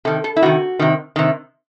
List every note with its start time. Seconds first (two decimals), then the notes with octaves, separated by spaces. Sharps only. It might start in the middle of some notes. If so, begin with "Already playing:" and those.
0.05 C3 D#3 A4
0.24 A4
0.36 E4
0.43 C3 D#3 F#4
0.79 C3 D#3
1.16 C3 D#3